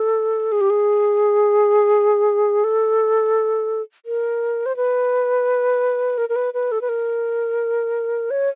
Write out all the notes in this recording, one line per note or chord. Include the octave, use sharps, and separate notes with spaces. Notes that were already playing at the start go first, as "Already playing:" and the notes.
Already playing: A4
G#4
G4
G#4
A4
A#4
C5
B4
A#4
A#4
B4
B4
A4
B4
A#4
C#5